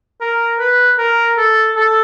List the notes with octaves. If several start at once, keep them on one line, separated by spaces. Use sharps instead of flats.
A#4
B4
A#4
A4
A4